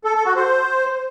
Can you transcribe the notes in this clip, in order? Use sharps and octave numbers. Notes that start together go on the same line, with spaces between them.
A4
A4
F#4
C5